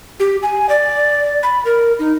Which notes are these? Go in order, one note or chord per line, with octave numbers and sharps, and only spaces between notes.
G4
G#5
D5
B5
A#4
D#4